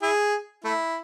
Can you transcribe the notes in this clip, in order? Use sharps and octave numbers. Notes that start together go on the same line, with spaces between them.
E4 G#4
A3 E4